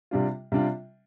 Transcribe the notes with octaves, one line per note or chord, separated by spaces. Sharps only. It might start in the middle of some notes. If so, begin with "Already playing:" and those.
C3 G3 D4 F4
C3 G3 D4 F4